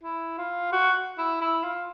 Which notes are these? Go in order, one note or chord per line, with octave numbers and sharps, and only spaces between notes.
E4
F4
F#4
E4
E4
F4